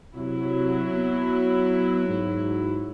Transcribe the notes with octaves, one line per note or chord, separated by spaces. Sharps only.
C3 F#3 E4
B3
G#2